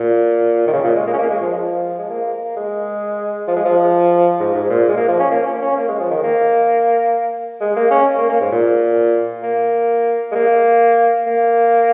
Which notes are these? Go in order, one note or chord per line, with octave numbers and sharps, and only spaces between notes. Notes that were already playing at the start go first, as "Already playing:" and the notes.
Already playing: A#2
D#3
C#3
A#2
G#3
A#3
C#4
A#3
G#3
F3
F3
G#3
A#3
A#3
G#3
F3
G#3
F3
G#2
G#2
A#2
G#3
A#3
F3
C#4
A#3
C#4
A#3
C#4
A#3
G#3
F3
D#3
A#3
G#3
A#3
C#4
A#3
A#3
G#2
A#2
A#3
G#3
A#3
A#3